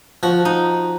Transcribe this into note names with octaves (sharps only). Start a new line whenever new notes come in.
F3 F#4
D#4